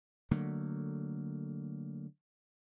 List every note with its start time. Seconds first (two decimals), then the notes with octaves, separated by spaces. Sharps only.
0.31 D3 F#3 A3 A#3